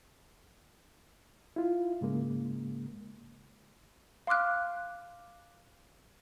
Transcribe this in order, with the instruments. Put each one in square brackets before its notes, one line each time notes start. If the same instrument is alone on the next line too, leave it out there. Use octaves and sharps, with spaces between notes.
[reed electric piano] E4 F4
G#2 C#3 G#3 A#3
[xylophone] F5 C6 D6 F6 F#6